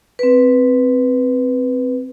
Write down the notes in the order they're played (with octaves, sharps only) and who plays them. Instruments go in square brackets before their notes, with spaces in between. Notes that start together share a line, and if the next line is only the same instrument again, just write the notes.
[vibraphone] C4 B4